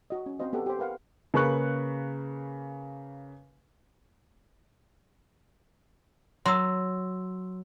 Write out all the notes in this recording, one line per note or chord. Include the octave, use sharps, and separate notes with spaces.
F#4 D#5
C#4
C4 F#4 C5 D#5 F5
B3 G4 A4 F#5
G4 C5
A#4 B4 F5 F#5
C#3 A#3 B4 C#6 F#6
F#3 C6 E6